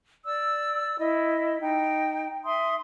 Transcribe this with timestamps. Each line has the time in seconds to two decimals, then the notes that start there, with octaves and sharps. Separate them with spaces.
0.25 D5 E6
0.98 E4 D#5
1.60 D#4 G5
2.44 E5 C6 D#6